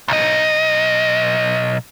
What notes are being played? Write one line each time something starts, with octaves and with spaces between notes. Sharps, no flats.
B1 D#5